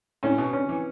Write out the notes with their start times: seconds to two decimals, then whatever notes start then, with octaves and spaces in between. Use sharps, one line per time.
0.23 A2 C#4
0.38 B2
0.53 C#4
0.69 E3